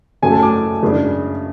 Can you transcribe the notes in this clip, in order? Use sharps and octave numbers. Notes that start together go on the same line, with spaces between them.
F#2 C#3 F#3 A3 C#4 G#5
A5
D6
F#2 C#3 G#3 D4